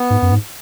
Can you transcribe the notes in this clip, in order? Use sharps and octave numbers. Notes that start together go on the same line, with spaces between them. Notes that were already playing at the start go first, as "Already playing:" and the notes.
Already playing: B3
G#2
F#2
G#2